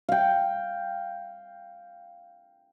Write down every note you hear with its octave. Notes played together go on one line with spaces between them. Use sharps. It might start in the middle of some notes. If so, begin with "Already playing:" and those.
F5 G5